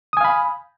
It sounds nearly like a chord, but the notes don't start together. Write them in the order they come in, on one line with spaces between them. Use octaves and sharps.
D#6 G#5 F5 B5